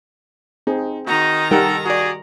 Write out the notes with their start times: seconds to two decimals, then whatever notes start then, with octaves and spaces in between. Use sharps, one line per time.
0.67 C4 D#4 G#4
1.07 D#3 D#4 F#4 A#5
1.51 G3 D#4 A4 A#4 F#5 G5
1.85 F#4 G#4 D5